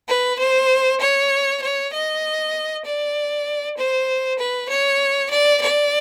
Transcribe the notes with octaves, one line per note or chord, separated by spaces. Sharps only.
B4
C5
C#5
C#5
D#5
D5
C5
B4
C#5
D5
D5